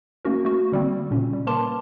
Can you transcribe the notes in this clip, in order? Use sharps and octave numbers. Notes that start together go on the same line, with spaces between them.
A3 A#3 C#4 F#4 A#4
A3 F#4
D3 G3 A#3 C4
A#2 C#3 C#4
G3
A#3 A#4 B4 A5 C6 D6